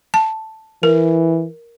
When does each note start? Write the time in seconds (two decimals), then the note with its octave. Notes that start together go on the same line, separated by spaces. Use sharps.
0.14 A5
0.83 E3 A#4